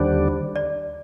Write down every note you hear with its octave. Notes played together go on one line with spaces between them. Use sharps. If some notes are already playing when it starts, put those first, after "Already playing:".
Already playing: D#2 D3 G3 D4 C5
D5